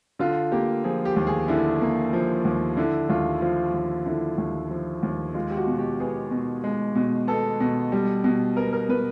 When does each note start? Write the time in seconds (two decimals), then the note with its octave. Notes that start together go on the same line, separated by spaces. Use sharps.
0.19 D3 F4
0.52 A#3 G4
0.84 F3 G#4
1.05 G4
1.16 D#2
1.27 G#4
1.48 D3 E4
1.82 A#3
2.13 F3
2.45 D#2
2.77 D3 E4
3.10 D#2 F4
3.42 F3 F4
3.74 D#2
4.06 D3 E4
4.38 D#2
4.71 F3
5.03 D#2
5.34 G#3 F4
5.50 G4
5.57 F#4
5.67 B2
5.79 G4
6.00 B3 G#4
6.31 B2
6.64 G#3
6.95 B2
7.28 B3 A4
7.60 B2
7.92 G3
8.24 B2
8.57 B3 A#4
8.73 A#4
8.89 B2 B4